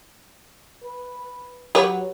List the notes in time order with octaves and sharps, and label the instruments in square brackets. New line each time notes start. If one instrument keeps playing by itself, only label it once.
[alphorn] B4
[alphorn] F#3 [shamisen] G4 B4 C#5